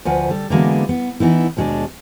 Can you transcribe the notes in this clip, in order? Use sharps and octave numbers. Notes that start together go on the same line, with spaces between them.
D2 F3 B4 F#5 G#5
G3 A4
D3 E3 F#3 G#3 A#3 B3
B3
E3 B3 D#4 E4
D#2 B2 G#3 B3 D4